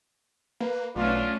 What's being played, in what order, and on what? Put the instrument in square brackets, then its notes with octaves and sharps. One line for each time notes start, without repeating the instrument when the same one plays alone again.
[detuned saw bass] A#3 [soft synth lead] B4
[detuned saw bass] B1 [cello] A3 C#4 [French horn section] D4 F4